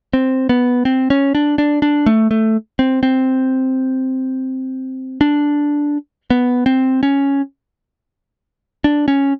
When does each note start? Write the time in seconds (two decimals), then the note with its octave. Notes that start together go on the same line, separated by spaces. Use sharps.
0.13 C4
0.49 B3
0.85 C4
1.10 C#4
1.35 D4
1.58 D4
1.82 D4
2.06 A3
2.31 A3
2.79 C4
3.03 C4
5.21 D4
6.30 B3
6.66 C4
7.03 C#4
8.84 D4
9.08 C#4